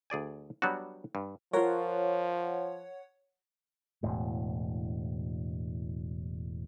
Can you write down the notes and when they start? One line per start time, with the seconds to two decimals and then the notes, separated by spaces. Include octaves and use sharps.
0.10 D2 G#4 D5 G#5
0.62 F#3 G3 B3 D4 F#4
1.15 G2
1.53 F3 F4 A#4 C#5 F#5
4.03 E1 A2